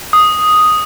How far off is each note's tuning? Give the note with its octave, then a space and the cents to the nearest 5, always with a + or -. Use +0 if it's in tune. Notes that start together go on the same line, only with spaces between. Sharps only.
D#6 +0